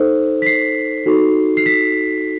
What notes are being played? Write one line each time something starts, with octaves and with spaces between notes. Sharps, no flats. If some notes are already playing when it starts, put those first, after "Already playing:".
Already playing: D#4 A4 C5
B6
C7
D#4 F#4 A4
C7
B6